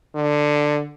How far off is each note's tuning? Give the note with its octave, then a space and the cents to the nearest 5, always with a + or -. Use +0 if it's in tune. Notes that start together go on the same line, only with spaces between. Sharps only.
D3 +10